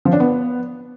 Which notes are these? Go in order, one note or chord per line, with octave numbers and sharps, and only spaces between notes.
F3
D4
B3